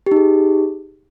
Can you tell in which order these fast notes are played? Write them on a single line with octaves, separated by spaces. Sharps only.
G4 D#4 G#4